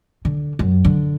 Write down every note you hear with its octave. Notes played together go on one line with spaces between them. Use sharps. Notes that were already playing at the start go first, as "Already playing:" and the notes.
D3
F#2
D3